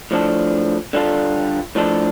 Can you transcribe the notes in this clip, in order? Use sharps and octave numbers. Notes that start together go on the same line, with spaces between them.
A2 F3 D4 A4
D3 G3 F4 A4
A2 F3 D4 A4